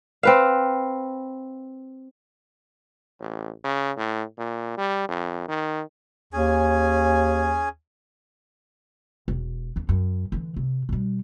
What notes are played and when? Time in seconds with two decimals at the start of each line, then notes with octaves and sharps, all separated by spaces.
0.23 C4 B4 F5
3.20 A1
3.64 C#3
3.97 A2
4.38 A#2
4.77 G3
5.09 F2
5.48 D#3
6.33 D#2 C#4 G#4 G#5
9.28 E1
9.76 D#2 D4
9.89 F#2
10.32 D3 E3
10.56 C3
10.89 B2 G3